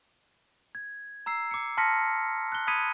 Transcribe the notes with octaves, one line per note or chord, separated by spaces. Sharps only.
G#6
A#5 E6 C7
D6 C#7
A5 C6 F6 A#6 B6 C#7
F#6 G7
B5 D#6 G#6 B6 C#7 D#7